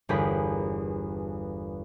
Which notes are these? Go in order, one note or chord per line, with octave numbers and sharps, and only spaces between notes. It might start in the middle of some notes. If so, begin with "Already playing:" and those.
G1 E2 G4 G#4 A#4 B5